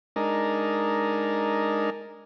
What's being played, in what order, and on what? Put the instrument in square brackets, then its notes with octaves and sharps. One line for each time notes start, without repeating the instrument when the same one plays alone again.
[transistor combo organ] G#3 D4 D#4 A#4